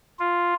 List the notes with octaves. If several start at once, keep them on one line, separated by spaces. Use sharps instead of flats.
F4